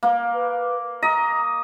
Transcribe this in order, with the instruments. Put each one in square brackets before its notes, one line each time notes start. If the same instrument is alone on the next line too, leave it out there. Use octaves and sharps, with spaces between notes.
[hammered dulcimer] A#3
[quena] B4
[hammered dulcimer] D#5 [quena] A#5